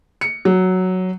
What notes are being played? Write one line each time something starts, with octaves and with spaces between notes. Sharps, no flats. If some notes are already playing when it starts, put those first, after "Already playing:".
C#7
F#3